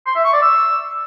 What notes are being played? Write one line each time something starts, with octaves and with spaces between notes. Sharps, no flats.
C6
E5
C#6
D5
E6